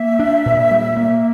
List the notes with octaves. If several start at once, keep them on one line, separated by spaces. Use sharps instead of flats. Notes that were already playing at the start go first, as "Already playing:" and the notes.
Already playing: A#3 E5
D4
A#2
G3
A#3